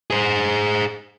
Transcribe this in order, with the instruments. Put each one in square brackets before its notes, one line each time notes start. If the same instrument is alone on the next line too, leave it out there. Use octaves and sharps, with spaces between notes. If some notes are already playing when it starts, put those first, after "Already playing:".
[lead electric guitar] G#4 C5